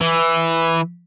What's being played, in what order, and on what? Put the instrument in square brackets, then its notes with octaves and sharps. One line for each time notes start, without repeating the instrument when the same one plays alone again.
[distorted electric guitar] E3